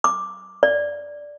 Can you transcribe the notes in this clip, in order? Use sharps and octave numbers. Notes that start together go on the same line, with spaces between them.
D6
D5